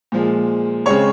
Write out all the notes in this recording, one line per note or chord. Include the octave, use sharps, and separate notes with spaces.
A#2 F3 G#3
C#3 G#3 C4 C#5 C#6